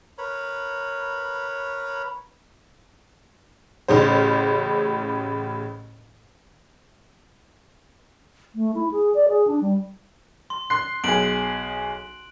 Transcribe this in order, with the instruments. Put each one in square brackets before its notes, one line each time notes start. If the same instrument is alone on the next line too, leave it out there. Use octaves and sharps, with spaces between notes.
[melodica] A#4 B4 C#5 B5
[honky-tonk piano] A1 A2 C#3 C5
[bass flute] A3
E4
G#4
D5
G#4
D4
G3
[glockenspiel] C6
[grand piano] C6 C7 [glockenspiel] F#6
[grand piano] B1 G#4 [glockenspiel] D7 F#7